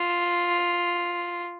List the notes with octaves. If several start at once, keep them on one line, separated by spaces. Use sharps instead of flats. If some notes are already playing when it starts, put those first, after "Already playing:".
Already playing: F4